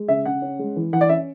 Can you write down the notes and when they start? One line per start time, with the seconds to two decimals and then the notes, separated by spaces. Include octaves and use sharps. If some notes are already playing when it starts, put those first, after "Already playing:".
Already playing: G#3
0.08 C#3 E5
0.26 C#3 F#5
0.42 C#4
0.59 G#3
0.76 E3
0.93 E3 F#5
1.01 D5
1.09 C#4 E5